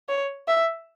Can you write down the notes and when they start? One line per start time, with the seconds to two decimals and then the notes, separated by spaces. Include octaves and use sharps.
0.08 C#5
0.48 E5